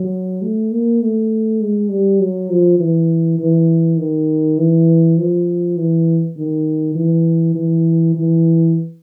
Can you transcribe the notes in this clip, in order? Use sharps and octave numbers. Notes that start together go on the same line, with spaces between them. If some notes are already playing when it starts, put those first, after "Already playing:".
Already playing: F#3
A3
A#3
A3
G#3
G3
F#3
F3
E3
E3
D#3
E3
F3
E3
D#3
E3
E3
E3